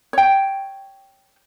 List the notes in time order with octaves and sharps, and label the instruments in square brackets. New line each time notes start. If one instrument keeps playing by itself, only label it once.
[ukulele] C#5 G5